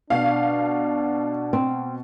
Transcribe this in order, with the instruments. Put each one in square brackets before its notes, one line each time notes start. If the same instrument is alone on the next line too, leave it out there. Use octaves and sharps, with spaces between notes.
[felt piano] B2 [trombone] D4 [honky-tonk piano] F5
[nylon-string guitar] C4